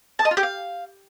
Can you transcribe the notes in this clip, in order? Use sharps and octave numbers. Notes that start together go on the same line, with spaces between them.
A5
D#5
F4
G4
F5